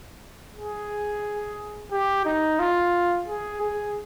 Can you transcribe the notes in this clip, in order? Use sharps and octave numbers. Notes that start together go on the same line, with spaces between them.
G#4
G4
D#4
F4
G#4
G#4